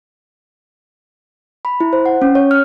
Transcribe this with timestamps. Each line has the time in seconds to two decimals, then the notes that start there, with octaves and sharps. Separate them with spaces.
1.65 B5
1.80 E4
1.93 C5
2.06 F#5
2.22 C#4
2.35 C#5
2.51 F6